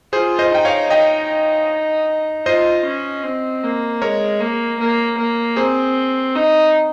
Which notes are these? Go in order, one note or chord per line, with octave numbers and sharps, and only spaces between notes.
F4 G#4 C5
C5 D#5
D#4 G5
C#5 F5
D#4 D#5 G5
F4 C5 D#5
C#4
C4
A#3
G#3 A#4 C#5
A#3
A#3
A#3
C4 G#4 C5
D#4